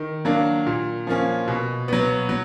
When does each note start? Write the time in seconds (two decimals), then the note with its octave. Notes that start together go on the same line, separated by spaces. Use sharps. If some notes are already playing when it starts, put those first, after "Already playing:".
Already playing: D#3
0.25 F#3 A#3 D4
0.67 A#2
1.07 F3 A#3 C#4
1.48 B2
1.88 F#3 B3
2.29 F#3